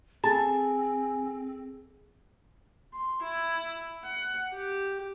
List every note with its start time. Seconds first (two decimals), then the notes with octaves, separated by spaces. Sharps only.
0.24 C4 G#4 A4 G#5 A5
2.94 C6
3.23 E4
4.05 F#5
4.54 G4